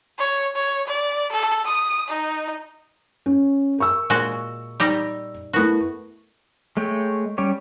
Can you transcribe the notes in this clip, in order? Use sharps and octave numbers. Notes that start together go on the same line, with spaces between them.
C#5
C#5
D5
A4
D#6
D#4
C#4
A#4 C#6 E6
A#2 G#3 F#4
G3 D#4 G4
A3 B3 E4 F#4 A#4
G#3 A3 C#5 G5
G3 C#4 G4 C#5